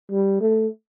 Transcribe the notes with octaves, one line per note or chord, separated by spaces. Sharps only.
G3
A3